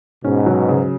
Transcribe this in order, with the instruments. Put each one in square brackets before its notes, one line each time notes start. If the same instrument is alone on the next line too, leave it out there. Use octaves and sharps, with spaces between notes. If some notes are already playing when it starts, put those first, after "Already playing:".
[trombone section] G#2 B2 [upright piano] C#4
[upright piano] F#3
C#3